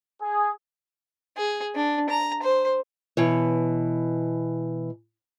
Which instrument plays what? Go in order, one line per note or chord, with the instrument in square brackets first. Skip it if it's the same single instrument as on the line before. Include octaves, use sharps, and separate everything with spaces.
[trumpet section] G#4
[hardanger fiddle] G#4
D4
A#5
C5
[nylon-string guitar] B2 E3 C#5